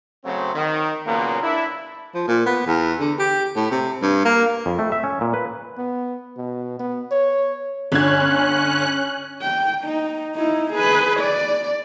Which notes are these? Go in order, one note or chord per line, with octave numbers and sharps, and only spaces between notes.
C#3 F#3 A3 C4
D#3
A#2 C#3 F#3 A#3 B3
D4 E4
F3
A#2
B3
E2
D3
G4
A2
C3
G2
A#3
F2
A3
E5
C#4
A#2
B4
B3
B2
B3
C#5
G1 D3 C#4 F#6 G#6
G5
D#4
D#4 E4
G#4 B4
D5